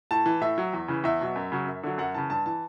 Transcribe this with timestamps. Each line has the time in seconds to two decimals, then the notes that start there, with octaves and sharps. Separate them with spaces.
0.11 A2 A5
0.26 E3
0.41 A2 E5
0.58 F#3
0.73 E2
0.88 C#3 E3
1.04 E2 E5
1.21 B2 F#3
1.36 F#2
1.52 C#3 F#3
1.67 F#2
1.83 D3 F#3
1.98 F#2 F#5
2.14 C#3 E3 A5
2.30 G2 A5
2.46 E3 A5